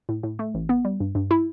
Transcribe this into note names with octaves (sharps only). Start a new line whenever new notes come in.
A2
A2
A3
A1
B3
G3
G2
G2
E4